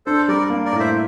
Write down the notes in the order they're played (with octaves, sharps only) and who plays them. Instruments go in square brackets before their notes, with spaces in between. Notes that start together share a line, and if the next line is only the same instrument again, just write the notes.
[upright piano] D4 [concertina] A4 C5
[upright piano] G3 [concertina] A#4 D5
[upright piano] A#3
[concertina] A#4 D5
[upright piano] A2
[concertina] C5 E5